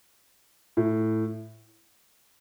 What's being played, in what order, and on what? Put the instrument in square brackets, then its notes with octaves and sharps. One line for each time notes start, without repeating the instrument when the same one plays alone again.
[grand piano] A2